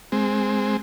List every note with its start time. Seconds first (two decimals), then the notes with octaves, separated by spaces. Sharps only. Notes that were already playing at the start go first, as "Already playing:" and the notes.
0.12 G#3 C4